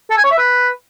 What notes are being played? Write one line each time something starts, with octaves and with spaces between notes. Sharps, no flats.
A4
G#5
C#5
E5
B4